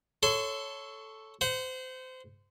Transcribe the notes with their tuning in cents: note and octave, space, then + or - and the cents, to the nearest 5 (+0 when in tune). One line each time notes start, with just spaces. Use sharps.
A4 +0 C#5 +0 C6 -25
C5 -25 F#5 +0